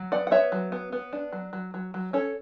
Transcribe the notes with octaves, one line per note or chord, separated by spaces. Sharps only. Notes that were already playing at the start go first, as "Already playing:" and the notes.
Already playing: F#3
B3 D5 F#5
F#5
B3 C#5 E5
F#3
B3
B3
D4
F#3
F#3
F#3
F#3
C#4 A4 C#5